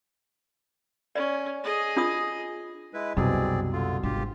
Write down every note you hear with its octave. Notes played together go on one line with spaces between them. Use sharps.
C#4 D5
G#4 D#5
D4 F4 D#6
G#3 E4 B4
C2 F#2 B2 C4 G#4 D5
D3 F4
G#1 D4 F4 G4